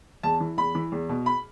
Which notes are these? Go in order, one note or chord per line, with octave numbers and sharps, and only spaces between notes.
E2 A5
E3
E2 B5
E3
E2
B2
B5